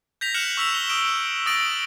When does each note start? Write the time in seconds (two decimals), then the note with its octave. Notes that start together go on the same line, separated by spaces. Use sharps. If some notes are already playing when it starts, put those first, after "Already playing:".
0.21 G6 A#6 B6 F7
0.34 F6 F#6 C#7 E7 F#7
0.57 C#6 E6 B6 E7 F7
0.74 G7
0.90 D#6 D7
1.46 D#6 A6 A#6 D7 F#7